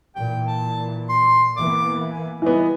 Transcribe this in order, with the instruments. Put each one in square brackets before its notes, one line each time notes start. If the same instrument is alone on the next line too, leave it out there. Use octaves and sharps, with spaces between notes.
[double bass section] A#2 E3 [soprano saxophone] G5
[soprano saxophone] A5
C6
[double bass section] E3 A#3 B3 [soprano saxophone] D6
[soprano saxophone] G#5
[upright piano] E3 B3 [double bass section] G3 [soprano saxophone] D#5